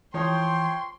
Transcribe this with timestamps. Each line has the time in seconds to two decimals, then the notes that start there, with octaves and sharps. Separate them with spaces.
0.14 E3 F3 C5 C#5 G5 C6 C#6 D#6